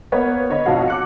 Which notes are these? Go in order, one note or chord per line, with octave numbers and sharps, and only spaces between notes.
A#3 B3 B4 C#5
D3 C#5 D#5 B5
B1 F2 F3 F#4 F5
D6 F#6 C#7